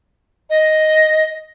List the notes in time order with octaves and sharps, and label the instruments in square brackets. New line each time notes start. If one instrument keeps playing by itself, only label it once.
[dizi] D#5